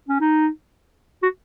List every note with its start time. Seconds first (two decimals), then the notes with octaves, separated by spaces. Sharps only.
0.09 C#4
0.20 D#4
1.23 F#4